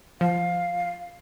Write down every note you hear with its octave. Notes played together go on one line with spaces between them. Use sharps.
F3 F5